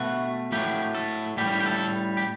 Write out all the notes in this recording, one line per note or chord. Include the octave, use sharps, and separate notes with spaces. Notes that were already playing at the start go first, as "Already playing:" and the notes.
Already playing: B2 A3 F#4
A2 F#3 A3 G4
A4
A2 G3 G4
G4
A4
G4